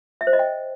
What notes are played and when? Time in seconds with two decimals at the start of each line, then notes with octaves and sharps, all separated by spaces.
0.21 E5
0.27 C5
0.33 D#5
0.39 G5